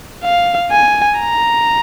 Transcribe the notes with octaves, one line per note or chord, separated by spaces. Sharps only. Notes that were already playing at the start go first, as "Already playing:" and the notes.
F5
G#5
A#5